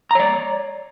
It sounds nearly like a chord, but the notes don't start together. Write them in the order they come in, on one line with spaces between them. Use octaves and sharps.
A#5 C#5 D5